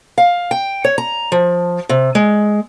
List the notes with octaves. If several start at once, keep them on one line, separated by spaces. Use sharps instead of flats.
F5
G5
C#5
A#5
F3
C3
G#3